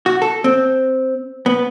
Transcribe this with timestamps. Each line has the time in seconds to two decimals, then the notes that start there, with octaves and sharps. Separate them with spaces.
0.06 F#4
0.22 A4
0.44 C4
1.46 B3